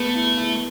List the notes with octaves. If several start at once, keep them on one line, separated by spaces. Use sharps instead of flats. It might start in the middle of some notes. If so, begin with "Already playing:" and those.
Already playing: A3 B3
E4
E4